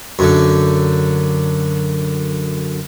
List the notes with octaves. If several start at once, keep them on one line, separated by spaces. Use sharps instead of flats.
F#2 D3